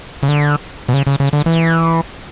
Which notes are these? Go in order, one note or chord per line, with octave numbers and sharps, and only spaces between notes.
C#3
D3
B2
C#3
C#3
C#3
D3
E3